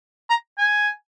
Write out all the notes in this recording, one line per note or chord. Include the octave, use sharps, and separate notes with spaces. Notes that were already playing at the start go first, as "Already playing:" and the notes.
A#5
G#5